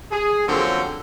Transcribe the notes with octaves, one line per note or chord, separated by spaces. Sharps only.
G#4
D3 F3 F#3 A#3 C4 C#4